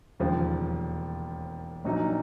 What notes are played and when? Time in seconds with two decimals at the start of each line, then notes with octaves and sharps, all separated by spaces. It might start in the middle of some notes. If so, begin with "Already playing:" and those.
0.20 E1 D#2 C#3 F3 F4
1.85 A#1 A#2 F#3 A#3 D#4